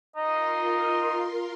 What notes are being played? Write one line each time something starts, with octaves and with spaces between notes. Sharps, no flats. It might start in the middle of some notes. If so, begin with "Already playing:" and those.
D#4 F4 A#4 D#5 C6